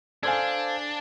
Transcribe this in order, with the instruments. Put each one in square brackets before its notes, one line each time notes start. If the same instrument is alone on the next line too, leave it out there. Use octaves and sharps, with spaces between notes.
[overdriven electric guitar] D4 [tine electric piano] A4 C5 F5 [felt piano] G#5 G#6